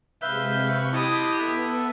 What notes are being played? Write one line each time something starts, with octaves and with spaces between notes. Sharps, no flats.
C3 G#3 B4 E5 F5 G6
C3 B5 C#6
E4 G4 D#5 A5 C6 D#6 F#6
B3 A4 E5 F#6